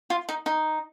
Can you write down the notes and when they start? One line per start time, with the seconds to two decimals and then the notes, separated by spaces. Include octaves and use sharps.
0.10 F4
0.29 D#4
0.46 D#4